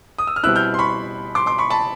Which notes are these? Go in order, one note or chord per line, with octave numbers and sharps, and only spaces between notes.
D#6
E6
F6
B2 G3 C4 E4 E6 F#6
F6 G6
C6
B5 C#6
C6 D6
C6 D6
B5 C#6
A5 B5